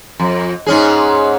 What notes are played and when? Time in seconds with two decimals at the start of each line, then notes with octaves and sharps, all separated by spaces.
0.20 F2
0.66 G#2 C#4 G#4